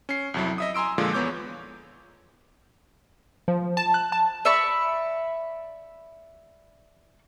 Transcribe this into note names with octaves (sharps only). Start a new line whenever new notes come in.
C#4 C7
C2 F2 F#3 E4
D#5 E5 D#6
G#5 A#5 C6 E6 D7
A#2 D3 F3 G#3 F4
E2 B3 C#5 D6 G6
F3
A5
F#6
A5
D5 E5 B5 C#6